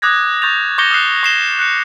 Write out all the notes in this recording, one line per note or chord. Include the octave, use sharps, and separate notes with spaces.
D6 D#6 F#6 G#6 A#6
C#6 G6 A6 F7
C#6 D6 G6 A#6 C#7 G7
D#6 F6 F#6 C7
C#6 C7 E7 G7
F#6 C#7